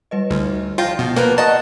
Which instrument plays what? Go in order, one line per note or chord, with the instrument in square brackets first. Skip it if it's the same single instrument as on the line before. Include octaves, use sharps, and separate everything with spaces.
[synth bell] G3 B4 D#5
[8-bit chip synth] D2 [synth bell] G3 D#4 F6
[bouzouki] F3 G5 [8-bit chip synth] F4 [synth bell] A#6
[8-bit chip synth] B2
[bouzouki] F3 B3 A#5 [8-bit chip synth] A#3
[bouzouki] F#4 D#5 [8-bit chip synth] A5 [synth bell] D#6 A#6